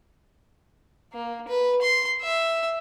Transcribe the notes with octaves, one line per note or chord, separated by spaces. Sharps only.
A#3
B4
C6
E5